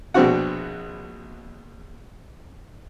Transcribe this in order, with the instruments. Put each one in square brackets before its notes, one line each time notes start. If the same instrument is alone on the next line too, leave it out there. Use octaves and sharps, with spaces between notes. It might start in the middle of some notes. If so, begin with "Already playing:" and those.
[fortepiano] A#1 B2 C4 D4 F#4 F#5